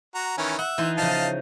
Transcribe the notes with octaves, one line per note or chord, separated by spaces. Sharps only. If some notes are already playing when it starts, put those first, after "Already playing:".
F#4 A#5
D#3 E3 C#4
E5 F#5
E3 D#4 C6
C#3 F3 D#5 F5 A5